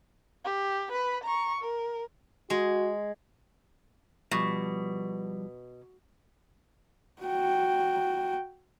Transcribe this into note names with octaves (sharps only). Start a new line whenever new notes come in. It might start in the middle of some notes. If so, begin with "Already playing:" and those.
G4
B4 B5
A#5 C#6
A#4
G#3 F#4
B2 F3 G3
F#4 G5